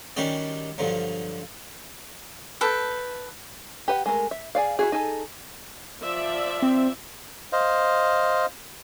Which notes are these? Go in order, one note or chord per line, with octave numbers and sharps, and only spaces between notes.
D#3 G3 C#4 F#4 G4 D5
G2 D3 F3 F#3
A4 B4 G5
G4 B4 F#5
G#3 A3 A#4
E5
G#4 D5 F5
E4 F#4 G#4
D#4 G#4 A4
F3 D5 E5
C4
C5 D#5 F5